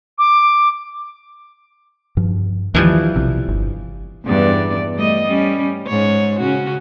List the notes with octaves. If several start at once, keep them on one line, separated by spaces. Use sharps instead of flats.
D6
G2 F3
D#2 E3 F3 G3
B1 C3
G1
E2 G2 D5
G3 A3 D#5
G3 C#4
G#2 C#5
C#3 C#4 F#4